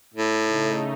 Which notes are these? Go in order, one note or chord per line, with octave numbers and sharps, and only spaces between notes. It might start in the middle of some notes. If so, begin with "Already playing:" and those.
A2
C#3 A3 D#4